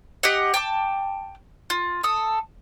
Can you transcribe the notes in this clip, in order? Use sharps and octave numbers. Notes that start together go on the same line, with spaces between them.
G4 D#5 F#5
G5 A5 D6
F4
A4 D#6